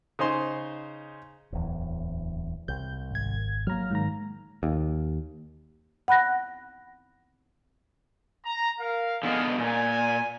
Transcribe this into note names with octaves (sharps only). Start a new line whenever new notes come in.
C#3 D#4 C5 C6
D1 E2
C2 G6
G#1 G#6
F#3 A#3 A#5 F6
G#2 D#3 A#5
D#2
F#5 B5 F#6 A#6
A#5
A#4 F5
D3 B3 G#4 D#5 F5
A#2 G#5